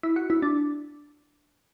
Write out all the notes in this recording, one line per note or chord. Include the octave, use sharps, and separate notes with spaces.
E4
F#4
E4
D4